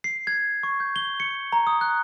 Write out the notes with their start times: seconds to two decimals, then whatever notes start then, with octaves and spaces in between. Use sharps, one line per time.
0.04 C7
0.27 G#6
0.63 C#6
0.80 G6
0.96 G7
1.20 C#7
1.52 A#5
1.67 D#6
1.81 F#6